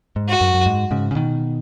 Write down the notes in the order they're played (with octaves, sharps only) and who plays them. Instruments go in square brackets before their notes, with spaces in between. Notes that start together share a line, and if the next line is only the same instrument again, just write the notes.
[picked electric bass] G#2
[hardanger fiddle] F#4
[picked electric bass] F#2
F#2
G#2
G#2 C#3
C#3
B2 D#3